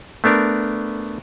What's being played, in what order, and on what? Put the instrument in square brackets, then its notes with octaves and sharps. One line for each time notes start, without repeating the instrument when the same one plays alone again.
[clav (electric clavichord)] A3 B3 D4 A#4